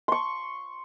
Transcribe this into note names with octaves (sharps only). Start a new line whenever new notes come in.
C6 C#6